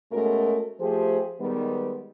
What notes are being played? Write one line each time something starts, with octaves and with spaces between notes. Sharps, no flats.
B2 G#3 A3 C#4 F#4 A#4
F3 A3 G4 G#4 C5
D#3 G3 G#3 B3